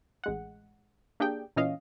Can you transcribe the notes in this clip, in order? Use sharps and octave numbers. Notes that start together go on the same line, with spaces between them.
A1 G#3 F#5
A#3 D4 G4 G#4 G5
A#2 E3 C#4 D#5 F5